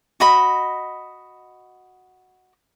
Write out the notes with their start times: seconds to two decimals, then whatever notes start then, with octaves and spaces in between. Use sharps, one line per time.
0.20 F#4 D#5 B5